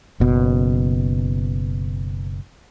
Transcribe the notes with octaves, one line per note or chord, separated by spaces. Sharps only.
F#1 B2